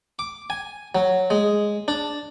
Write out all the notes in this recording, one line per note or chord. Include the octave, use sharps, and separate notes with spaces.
D6
G#5
F#3
G#3
D4